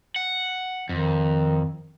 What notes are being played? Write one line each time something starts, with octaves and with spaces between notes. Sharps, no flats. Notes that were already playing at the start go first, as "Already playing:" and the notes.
F#5
F2 D#3